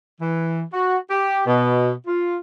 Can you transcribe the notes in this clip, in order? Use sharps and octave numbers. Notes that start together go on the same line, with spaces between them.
E3
F#4
G4
B2
F4